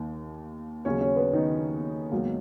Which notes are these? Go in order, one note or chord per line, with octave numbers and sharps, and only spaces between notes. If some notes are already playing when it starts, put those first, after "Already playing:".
Already playing: D#2 D#3 A#3
D#2 C#3 F#3 C#4 C#5
C#4 C#5
B3 B4
D#3 D#4
C#2 B2 F#3 A#3